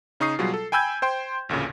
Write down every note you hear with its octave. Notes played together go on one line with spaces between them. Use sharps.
C#3 D#4 C#6 D#6 C7
B2 F#3 G3 F4 G#4
A4
G5 G#5 B5 E6 G6 G#6
C5 G5 C6
A1 D2 A#2 C#3